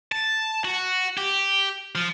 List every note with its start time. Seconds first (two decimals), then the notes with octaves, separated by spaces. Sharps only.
0.12 A5
0.64 F#4
1.18 G4
1.95 F3